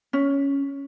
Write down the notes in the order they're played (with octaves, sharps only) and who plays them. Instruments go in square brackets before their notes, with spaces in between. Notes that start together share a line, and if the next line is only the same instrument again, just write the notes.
[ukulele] C#4